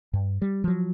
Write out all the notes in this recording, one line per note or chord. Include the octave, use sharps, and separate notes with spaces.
G2
G3
F3 F#3